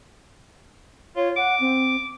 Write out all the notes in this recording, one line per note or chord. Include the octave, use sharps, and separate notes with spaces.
F4 C#5
F#5 D6
C4